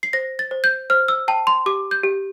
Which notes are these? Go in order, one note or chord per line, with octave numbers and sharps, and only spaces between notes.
C7
C5 A#6
A6
C5
G6
C5 F6
E6
G5 A5
C6
G4 D6
G6
G4